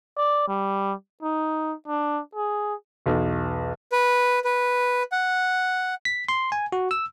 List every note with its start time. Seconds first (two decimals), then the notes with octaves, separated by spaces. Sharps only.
0.17 D5
0.48 G3
1.23 D#4
1.88 D4
2.35 G#4
3.06 B1 E2
3.92 B4
4.44 B4
5.12 F#5
6.05 B6
6.29 C6
6.52 G#5
6.72 F#4
6.91 E6